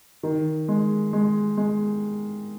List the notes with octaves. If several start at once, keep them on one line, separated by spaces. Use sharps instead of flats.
D#3
G#3
G#3
G#3